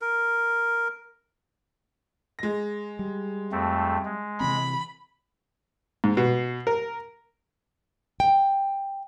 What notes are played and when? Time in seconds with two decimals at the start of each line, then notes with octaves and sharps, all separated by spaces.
0.02 A#4
2.39 G#3 A#6
2.99 G3
3.52 F2 A3 C4
4.05 G#3
4.40 C3 E3 C4 B5
6.04 G#2
6.17 B2
6.67 A#4
8.20 G5